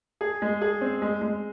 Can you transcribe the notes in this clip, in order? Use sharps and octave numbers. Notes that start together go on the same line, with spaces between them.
G#4
G#3
G#4
C4
G#3
G#3